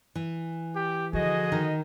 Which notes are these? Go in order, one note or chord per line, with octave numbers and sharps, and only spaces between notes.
E3
G4
D3 F3 F#4 G#4 D#5
D#3